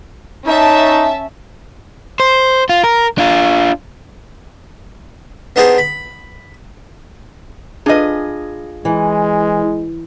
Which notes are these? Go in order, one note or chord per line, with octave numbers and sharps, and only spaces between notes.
C#4 D#4 E5 A5
C5
F4
A#4
D4 F4
B3 D4 D#4 G4 G#4 C5
B5
D4 F4 G#4 B4 D#5
E3 G#3